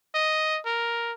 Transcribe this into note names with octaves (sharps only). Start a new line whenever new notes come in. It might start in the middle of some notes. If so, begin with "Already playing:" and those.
D#5
A#4